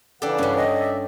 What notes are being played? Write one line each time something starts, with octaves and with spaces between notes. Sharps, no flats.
C#3 E3 D4 G4 A4 F#5
G2 G3 C#4 B4
D#5
D5 E5